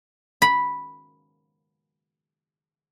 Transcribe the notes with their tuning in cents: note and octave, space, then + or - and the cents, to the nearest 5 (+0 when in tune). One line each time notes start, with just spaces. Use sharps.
B5 -5